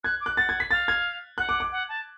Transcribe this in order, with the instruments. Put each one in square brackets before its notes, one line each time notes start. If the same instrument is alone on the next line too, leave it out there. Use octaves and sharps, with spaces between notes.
[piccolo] F#6 [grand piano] G#6
[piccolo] D6
[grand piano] F#6
[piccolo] F#5 [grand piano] A6
[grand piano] G#6
B6
[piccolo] F5 [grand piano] A6
[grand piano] G#6
[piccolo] F#5 [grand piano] F#6
[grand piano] D6
D6
[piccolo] F#5
A5